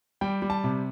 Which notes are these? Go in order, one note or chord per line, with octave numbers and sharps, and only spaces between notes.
G3 G5
G3
A5
C3